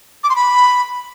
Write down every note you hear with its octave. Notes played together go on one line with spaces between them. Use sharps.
D6
C6
B5